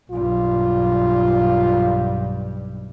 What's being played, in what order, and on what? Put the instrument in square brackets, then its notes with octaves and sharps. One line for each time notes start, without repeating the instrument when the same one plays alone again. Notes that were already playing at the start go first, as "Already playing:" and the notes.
[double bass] B1 G2 [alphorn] F4